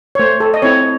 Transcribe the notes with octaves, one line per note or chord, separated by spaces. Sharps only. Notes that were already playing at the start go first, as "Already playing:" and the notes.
C#5
A3 C5
A4
D#5
C4 E4 C#5